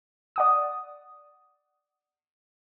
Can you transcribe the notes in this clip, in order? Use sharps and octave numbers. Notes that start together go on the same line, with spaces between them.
D5 F#5 D#6